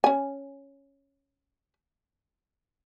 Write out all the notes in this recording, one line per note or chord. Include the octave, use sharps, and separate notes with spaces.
C#4 G#5